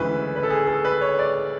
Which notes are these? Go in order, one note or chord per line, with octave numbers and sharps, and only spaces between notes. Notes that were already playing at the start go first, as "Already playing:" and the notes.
Already playing: D2 C#3 E3 G#3 B4
B4
A4
G#4
A4
B4
C#5
D5